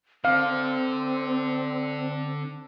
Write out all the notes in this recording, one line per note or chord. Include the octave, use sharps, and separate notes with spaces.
D3 C4 F5